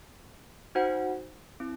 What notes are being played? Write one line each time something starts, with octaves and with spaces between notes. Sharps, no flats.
D#4 F#4 C5 F#5
C4 E4